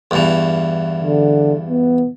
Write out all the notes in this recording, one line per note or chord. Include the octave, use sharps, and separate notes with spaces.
E2 G2 E3
D3
B3